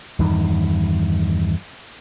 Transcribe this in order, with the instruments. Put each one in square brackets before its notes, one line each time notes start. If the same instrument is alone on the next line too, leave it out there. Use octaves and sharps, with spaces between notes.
[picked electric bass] E2 G2 D#3